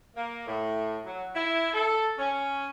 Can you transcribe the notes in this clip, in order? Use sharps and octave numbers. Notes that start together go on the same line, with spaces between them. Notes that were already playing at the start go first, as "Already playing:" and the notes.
A#3
A2
F#3
E4
A4
C#4